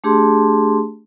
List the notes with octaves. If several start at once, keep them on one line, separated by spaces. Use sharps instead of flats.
A3 D4 G4 G#4 A5 C6